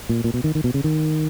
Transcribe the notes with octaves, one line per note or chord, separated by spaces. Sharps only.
A#2
A#2
B2
D#3
D#3
B2
C#3
D#3